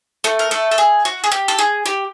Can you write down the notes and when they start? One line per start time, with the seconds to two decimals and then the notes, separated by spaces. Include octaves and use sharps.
0.24 A3 A4
0.39 A#4
0.51 A3 A4
0.71 A4
0.78 G#4
1.05 F#4
1.24 G#4
1.32 G4
1.48 A4
1.59 G#4
1.86 G4